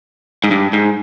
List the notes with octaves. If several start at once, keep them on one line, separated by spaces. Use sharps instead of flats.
G#2
G2
G#2